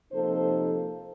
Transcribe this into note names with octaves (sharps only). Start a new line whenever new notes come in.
C3 F3 A#3 D#4 A4 C5